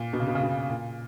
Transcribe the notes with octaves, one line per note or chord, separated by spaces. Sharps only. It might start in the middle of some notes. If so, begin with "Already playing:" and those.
Already playing: A#2
B2
C#3
B2
C#3
B2
A#2